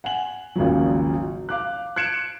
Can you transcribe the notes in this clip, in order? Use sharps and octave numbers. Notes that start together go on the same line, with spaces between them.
F#5 G#5 F#7
G#1 D#2 C#3 F3 F#3
F5 D6 F#6
F#6 G#6 C#7 D7 E7